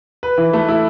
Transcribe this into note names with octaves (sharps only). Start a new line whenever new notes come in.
B4
E3
A3
E4